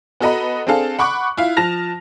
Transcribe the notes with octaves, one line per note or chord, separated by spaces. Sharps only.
B3 F#4 A4 D#5 A#5 B5
C4 D4 G#4 A4 F5 A5
F#5 B5 C#6 D6 F#6
E4 F4 F5
F3 A5 F6 A#6 F7